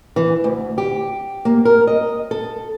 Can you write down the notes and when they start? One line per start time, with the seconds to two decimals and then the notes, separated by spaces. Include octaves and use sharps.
0.16 E3
0.44 D2
0.78 G4
1.45 A#3
1.65 A#4
1.87 D#5
2.31 A4